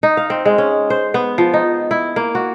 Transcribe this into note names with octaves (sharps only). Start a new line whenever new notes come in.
D#4
F5
C4
G#3
C#4
C5
B3
F3
D#4
E4
A#3
F#4